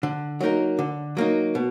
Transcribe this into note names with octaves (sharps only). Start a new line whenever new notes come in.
D3
F#3 A#3 D#4 A#4
D3
F#3 A#3 D#4
B2